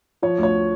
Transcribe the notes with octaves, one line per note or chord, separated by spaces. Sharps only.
F3 C#5
D2
C#5